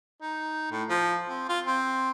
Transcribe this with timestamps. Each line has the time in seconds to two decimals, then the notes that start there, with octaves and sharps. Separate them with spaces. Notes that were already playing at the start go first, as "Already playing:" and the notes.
0.21 D#4
0.71 A2
0.89 F3
1.29 C4
1.48 F4
1.66 C4